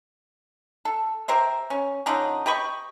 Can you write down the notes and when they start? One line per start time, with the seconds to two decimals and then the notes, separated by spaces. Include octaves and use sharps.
0.85 A4
1.28 G4 A#4 C5 E5
1.70 C#4
2.06 D3 F3 C#4 D#4
2.46 G4 D#5 B5 C#6